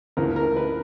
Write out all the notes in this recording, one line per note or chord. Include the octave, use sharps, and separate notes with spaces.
D2 C#3 E3 A#3 A#4
A#4
B4